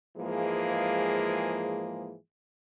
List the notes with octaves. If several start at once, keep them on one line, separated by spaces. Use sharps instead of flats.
G#2 E3 F3 G#3 A#3 G#4